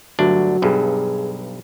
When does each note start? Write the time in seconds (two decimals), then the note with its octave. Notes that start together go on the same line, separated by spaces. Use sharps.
0.19 G1 D2 F#3 D4
0.62 B1 G2 G#4